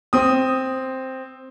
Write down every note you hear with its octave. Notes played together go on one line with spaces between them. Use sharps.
C4 D#6